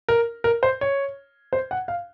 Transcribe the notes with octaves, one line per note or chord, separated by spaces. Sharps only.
A#4
A#4
C5
C#5
C5
F#5
F5